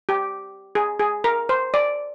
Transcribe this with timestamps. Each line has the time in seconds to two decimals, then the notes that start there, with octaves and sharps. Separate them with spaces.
0.09 G4
0.75 G#4
0.99 G#4
1.24 A#4
1.49 C5
1.74 D5